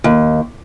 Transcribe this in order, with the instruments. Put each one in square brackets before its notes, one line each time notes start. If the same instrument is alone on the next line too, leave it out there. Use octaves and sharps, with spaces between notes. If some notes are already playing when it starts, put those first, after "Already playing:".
[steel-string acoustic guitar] D#2